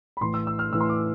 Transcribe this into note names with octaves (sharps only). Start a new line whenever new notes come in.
B5
A2 E3 C6
E6
E6
F6
A2 E3 E6
C6
D6